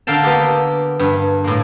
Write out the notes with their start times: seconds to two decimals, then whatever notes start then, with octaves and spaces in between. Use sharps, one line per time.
0.07 D3 A#4 F5 G5 A5
0.23 A#3 B3 G4 A4
0.99 G2
1.44 A2 G#3 A#3